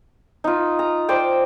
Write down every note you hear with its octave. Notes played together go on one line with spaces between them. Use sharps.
D#4 F4
A#5
C5 D5 G5